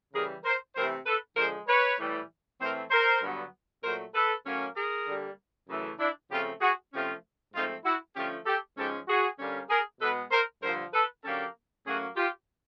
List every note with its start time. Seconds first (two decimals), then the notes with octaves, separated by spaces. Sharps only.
0.14 C#3 E3 G3 G#4 A#4
0.44 A#4 C5
0.75 C3 E3 A3 C4 A#4 C5
1.06 A4 B4
1.37 D3 F3 G#3 A#4 C5
1.67 B4 C#5
1.99 A2 E3 G3
2.60 A2 E3 A3 C4 A#4 C5
2.91 A#4 C5
3.22 G2 D3 F#3 B3
3.84 A#2 F#3 A3 A#4 C5
4.14 A4 B4
4.45 A2 F#3 A#3 C#4
4.76 G#4 A#4
5.07 D3 G3 A#3
5.68 F#2 C#3 E3 A3
5.99 D4 E4
6.31 C#3 F3 A3 C4 F4 G4
6.61 F#4 G#4
6.92 C3 F3 A3 C#4 F4 G4
7.54 G#2 F3 A3 C4 D#4 F4
7.85 E4 F#4
8.16 D3 F3 A3 C#4 F4 G4
8.46 G4 A4
8.77 G#2 F3 G#3 C#4 G4 A4
9.08 F#4 G#4
9.39 D3 G3 A#3 C#4
9.70 G#4 A#4
10.01 B2 G#3 B3 A4 B4
10.32 A#4 C5
10.63 G2 D3 F3 A#4 C5
10.94 A4 B4
11.24 D3 F#3 A#3 C#4 G4 A4
11.86 A2 F#3 A#3 C#4 F#4 G#4
12.17 F4 G4